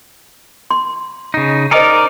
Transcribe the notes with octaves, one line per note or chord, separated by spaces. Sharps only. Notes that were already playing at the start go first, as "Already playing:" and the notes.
C6
C#3 D#4
D#4 A#4 C5 D5 D#5 G#5